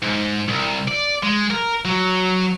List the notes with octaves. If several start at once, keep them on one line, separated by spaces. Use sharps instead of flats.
G#2
C2
D5
G#3
A#4
F#3